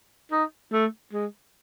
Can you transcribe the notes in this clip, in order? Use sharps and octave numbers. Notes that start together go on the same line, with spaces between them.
D#4
A3
G#3